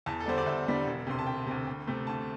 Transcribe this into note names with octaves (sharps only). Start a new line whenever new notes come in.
E2 A5
A4
D3 G3 D4 C5
D5
E2 E5
D3 G3 D4
E1
D2 C3 C6
A5
E1 G5
D2 C3
D2
C3 A3 C4
D2 A5